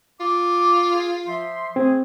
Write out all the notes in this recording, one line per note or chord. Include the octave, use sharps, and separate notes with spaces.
F4 D6
G#4
F3 E5 C6
A3 C4 G#4